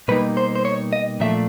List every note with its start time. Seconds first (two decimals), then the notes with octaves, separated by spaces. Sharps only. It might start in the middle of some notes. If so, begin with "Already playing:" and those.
0.08 B2 G3 A#3 D#4 B4
0.37 C5
0.55 C5
0.65 C#5
0.93 D#5
1.20 A#2 F3 A3 D4 E5